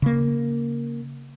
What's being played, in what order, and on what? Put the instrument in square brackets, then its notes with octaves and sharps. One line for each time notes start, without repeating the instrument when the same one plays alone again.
[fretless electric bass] C#3 A#3